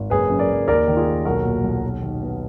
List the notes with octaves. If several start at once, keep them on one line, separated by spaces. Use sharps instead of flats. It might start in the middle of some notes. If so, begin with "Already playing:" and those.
Already playing: G#1
F#1 G#4 B4
F#2
A#4 D5
F#1
D#2 A#4 D5
D#3
F4 G#4
D#2
B1 F#4 A#4
A#2
B1
D#2
D#3
B3